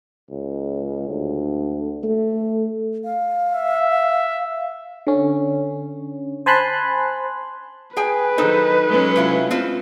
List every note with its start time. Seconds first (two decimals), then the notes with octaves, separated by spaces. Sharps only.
0.30 C#2
1.09 D2
2.04 A3
3.04 F5
3.53 E5
5.07 D3 C#4
6.46 C5 G#5 A5 B5 C6 F#6
7.97 G#4 B4 G5 G#5
8.38 D#3 F#3 D#4 A4 C5
8.87 F#3 G#3 C#4
9.16 C3 E4 F4
9.51 C4 F4 B4